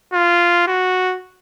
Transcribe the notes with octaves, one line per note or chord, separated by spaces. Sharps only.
F4
F#4